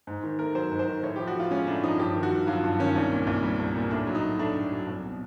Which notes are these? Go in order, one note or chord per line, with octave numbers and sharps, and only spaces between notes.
G#2
D#3
A3 A#4
F#3 C5
G#2
C5
D#3
A2 C#5
G4
F3
F#4
A2 F4
G#3 C#4
A2 D4
F3 D#4
G2 G4
D#3
F#4
G2
F#3 F4
G2
D#3 C#4
C2
A#2
C2
G3
C2
A#2
A2 D4
F#3
D#4
A2
A3 D4
A2
F#3
C2
B2